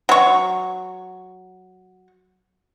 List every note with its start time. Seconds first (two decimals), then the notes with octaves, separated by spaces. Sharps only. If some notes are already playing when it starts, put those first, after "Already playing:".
0.09 F#3 C#6